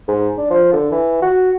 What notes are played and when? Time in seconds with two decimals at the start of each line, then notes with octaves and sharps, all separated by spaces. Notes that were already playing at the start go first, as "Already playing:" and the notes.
0.08 G#2
0.38 D4
0.51 F3
0.73 D3
0.92 E3
1.22 F#4